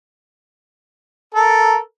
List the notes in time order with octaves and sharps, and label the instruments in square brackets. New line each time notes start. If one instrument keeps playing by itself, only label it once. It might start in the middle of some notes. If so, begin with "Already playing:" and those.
[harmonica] A4 A#4